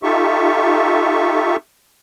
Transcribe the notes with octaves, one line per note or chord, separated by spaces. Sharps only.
D#4 F4 G4 A4 E5 C#6